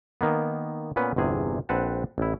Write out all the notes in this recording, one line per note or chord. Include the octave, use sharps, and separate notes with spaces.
D#3 A#3 B3
A#2 B3 C#4 B4
G1 E2 C3 G#4 G#5
A#1 C4 B4 F#5 A5
A1 E4